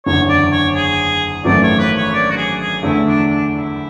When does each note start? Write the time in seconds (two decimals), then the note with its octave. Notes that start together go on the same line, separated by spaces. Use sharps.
0.06 F#1 E2 D3 C#5
0.29 D5
0.52 C#5
0.75 G#4
1.44 G#1 F#2 E3 A3 D5
1.63 C#5
1.79 B4
1.97 C#5
2.13 D5
2.30 F#4
2.37 G#4
2.60 G#4
2.83 E2 D3 A3 E4
3.07 D4
3.29 D4
3.53 E4